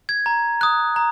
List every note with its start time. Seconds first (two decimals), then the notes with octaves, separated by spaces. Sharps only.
0.09 G#6
0.26 A#5
0.61 D#6 F#6
0.96 A#5